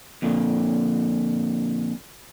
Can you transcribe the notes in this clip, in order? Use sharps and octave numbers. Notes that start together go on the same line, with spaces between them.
F2 A#2 D3